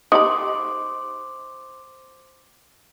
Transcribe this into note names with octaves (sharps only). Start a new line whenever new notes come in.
D#4 G4 C5 B5 C6 D6 D#6